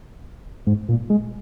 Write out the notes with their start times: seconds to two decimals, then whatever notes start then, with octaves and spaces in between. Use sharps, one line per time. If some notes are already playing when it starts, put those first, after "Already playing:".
0.67 G#2
0.89 A#2
1.10 G#3